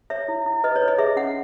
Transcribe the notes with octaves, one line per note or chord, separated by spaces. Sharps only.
C#5 E5
E4
E4
B4 D#5
C#5
B4
D#5
G#4 E5
C#4 F#5